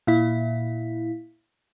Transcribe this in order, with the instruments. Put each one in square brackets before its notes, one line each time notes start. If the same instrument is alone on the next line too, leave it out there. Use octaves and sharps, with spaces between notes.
[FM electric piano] A#2 E4